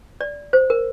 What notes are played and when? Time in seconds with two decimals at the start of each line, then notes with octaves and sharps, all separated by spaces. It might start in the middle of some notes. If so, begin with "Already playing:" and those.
0.21 D5
0.53 C5
0.70 A#4